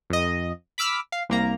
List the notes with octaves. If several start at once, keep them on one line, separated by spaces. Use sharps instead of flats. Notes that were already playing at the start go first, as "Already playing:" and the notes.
F2 D#5
B5 D6 E6 F6 B6
F5
C2 A#3 A#5